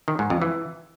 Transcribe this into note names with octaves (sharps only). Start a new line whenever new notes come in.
D#3
G#2
F2
E3